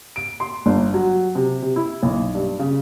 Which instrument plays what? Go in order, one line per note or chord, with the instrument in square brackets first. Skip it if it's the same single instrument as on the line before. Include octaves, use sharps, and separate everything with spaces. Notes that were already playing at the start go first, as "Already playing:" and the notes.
[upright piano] D7
C6
G1
F#3
C3
C3
E4
B1
G2
C#3